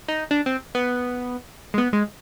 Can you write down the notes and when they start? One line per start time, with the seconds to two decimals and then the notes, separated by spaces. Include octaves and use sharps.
0.08 D#4
0.31 D4
0.46 C4
0.75 B3
1.74 G#3
1.78 B3
1.93 G#3